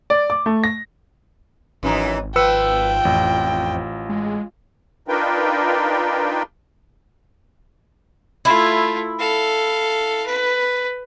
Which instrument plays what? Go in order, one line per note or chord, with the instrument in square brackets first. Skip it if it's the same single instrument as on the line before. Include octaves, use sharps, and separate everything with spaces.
[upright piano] D5
D6
A3
A#6
[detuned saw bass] G#1 [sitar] F#2 E3 D#4
[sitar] F3 [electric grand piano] B4 E6 C#7 [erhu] G5
[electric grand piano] A1 [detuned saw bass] F2
[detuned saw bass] G#3
[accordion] D4 D#4 F4 A#4 B4 G5
[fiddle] A3 F4 [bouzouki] E4
[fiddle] A4 F5
B4